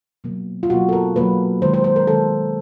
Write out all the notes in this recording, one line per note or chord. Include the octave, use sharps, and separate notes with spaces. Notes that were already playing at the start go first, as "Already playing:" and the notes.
B2 F#3 A#3
F4
B2 F#3 A#3 F#4
A4
A#4
B2 F#3 A#3 B4
D#3 G#3 C5
C5
C5
A#4
D#3 G#3 A4